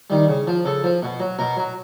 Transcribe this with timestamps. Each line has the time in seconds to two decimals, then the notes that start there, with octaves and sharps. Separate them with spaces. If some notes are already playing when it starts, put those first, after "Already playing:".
0.10 D#3 G3
0.28 C#3
0.47 F3
0.65 C#3 A4
0.84 F3
1.02 B2
1.20 F#3
1.39 B2 A#4
1.57 F#3